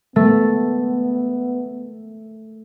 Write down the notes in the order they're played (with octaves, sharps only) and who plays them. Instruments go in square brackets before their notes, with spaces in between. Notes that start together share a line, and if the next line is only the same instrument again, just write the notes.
[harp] A3 [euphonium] B3